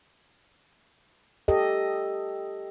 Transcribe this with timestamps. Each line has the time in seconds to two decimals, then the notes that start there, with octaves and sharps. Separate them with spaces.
1.48 G4 A4 D#5